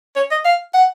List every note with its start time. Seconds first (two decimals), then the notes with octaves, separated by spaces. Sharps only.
0.16 C#5
0.31 D#5
0.45 F5
0.74 F#5